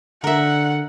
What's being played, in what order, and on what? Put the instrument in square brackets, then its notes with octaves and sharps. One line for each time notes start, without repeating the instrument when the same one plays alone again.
[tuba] D3 [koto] A#4 E5 [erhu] F#5